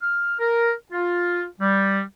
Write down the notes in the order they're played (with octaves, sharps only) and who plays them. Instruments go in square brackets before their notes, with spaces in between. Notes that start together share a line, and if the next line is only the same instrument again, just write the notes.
[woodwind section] F6
A#4
F4
G3